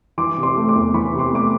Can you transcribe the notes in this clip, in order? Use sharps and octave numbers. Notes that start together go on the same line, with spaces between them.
E3 C6 D6
C3
C6 D6
A3
C6 D6
E2
E3 B5 C#6
C3
C6 D6
A3 D6